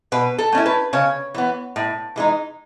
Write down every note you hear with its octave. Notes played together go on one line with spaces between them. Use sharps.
B2 B4
A4
A3 C#4 E4
B4
C#3 C#5
E3 B3
A2
E3 G#3 D#4